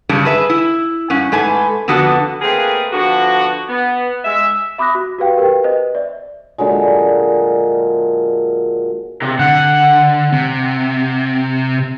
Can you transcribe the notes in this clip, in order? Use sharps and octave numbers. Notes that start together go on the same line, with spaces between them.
G2 C#3 G3 A3 D4
G#4 B4 E5
E4
G2 C#4 F#5
G#2 A3 B4 G#5
F2 D3 B3 F#4 A4
A3 A#3 C4 G#4 A#4 B4
D3 F3 B3 F#4
B3
G#3 E5
E5 B5 D6 D#6 F#6 A#6
F#4
F#4 G4 B4 F5 G5
G4 A#4 B4 G5
B4 C5 D#5
D5 E5
A#2 D3 F#3 G#3
C3
D3 F#5
C3